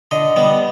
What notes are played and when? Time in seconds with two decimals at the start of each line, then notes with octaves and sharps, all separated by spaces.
0.11 D3 D#5
0.36 G3 B3